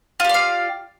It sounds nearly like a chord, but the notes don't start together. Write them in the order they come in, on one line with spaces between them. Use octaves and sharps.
F4 G4 D5 F5